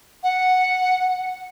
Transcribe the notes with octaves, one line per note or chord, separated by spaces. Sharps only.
F#5